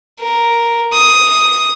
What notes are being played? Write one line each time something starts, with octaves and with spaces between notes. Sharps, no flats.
A#4
D#6